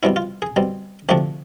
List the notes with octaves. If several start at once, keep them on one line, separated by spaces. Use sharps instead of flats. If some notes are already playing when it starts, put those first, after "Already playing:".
B2 G3 C4 E4
F4
G#4
B2 G3 C4
D2 C3 F3 A3 D4 G4